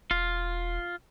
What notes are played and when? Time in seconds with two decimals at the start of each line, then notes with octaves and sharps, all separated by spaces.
0.11 E1 F4